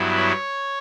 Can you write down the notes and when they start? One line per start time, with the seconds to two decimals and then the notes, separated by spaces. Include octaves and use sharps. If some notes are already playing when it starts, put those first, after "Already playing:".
Already playing: G2 F#3 B3 E4
0.17 C#5